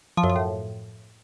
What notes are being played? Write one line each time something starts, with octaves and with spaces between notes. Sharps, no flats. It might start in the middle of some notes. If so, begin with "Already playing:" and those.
F3
F#2
F3
A2